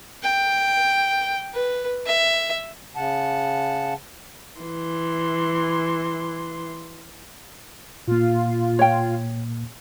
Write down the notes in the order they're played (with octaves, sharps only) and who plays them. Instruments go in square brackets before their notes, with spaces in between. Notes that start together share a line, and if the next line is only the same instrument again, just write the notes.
[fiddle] G5
B4
E5
[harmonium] C#3 F#5 A5
[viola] E3 C6
[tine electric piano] A#2 A#3 [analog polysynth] F4
[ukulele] C#5 G5